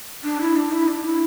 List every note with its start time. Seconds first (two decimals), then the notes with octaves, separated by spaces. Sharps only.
0.24 D4
0.41 E4
0.56 D4
0.72 E4
0.88 D4
1.04 E4